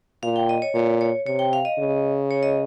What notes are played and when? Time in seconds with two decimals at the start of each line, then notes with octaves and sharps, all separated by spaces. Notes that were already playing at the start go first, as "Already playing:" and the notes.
0.23 A#2 F5
0.36 G5
0.49 D#5
0.62 C#5
0.74 A#2 C#5
1.01 C#5
1.26 C3 C#5
1.39 G5
1.53 F5
1.65 D#5
1.79 C#3
2.31 C#5
2.43 D#5